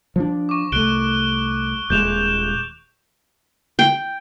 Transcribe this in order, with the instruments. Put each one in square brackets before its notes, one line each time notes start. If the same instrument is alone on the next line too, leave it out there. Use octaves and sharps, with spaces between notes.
[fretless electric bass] F3 D4
[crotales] C#6 D6
[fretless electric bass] C2 A3 [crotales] F#6 D7 G7
[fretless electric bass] D#1 G#3 [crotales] G6 E7 F7
[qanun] G5